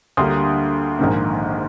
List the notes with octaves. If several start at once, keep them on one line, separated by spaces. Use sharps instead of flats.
D2 D3 G3 A#3 C6 D#6
A#1 G#2 D#3 A#3